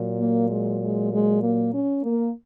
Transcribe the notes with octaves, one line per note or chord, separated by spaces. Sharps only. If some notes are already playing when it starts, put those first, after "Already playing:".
Already playing: A#2 F#3
A#3
G#3
G#3
G#3
A#3
C#4
A#3